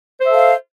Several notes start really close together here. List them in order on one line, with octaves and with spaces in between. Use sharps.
C5 E5 A4 F5